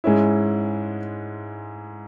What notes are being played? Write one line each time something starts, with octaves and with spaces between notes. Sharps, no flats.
G#2 G#3 C#4 E4